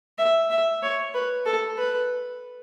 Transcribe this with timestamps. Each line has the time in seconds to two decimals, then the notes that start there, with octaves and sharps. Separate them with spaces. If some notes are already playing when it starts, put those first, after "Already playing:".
0.18 E5
0.50 E5
0.82 C#5
1.14 B4
1.46 A4
1.77 B4